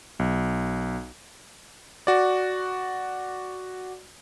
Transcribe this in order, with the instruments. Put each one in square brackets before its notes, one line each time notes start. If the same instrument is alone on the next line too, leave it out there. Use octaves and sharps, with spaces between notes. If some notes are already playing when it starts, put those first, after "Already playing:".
[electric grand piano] B1
F#4 D5